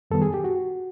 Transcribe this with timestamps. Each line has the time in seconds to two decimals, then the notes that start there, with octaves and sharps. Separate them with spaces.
0.11 F#2 D#3 G3 B3 A4
0.22 G#4
0.34 G4
0.44 F#4